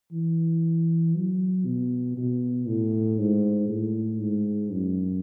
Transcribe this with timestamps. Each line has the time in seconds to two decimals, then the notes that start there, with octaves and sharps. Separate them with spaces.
0.12 E3
1.15 F#3
1.66 B2
2.17 B2
2.67 A2
3.19 G#2
3.69 A2
4.20 G#2
4.72 F#2